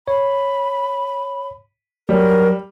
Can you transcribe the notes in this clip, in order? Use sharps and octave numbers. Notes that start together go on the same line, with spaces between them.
C#5 B5
F#3 G3 A#4